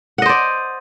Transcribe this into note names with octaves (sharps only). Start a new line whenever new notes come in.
C5 D5 D#5 F#5